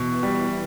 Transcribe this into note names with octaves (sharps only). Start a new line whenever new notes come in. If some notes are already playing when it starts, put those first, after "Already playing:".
Already playing: B2 E3
G3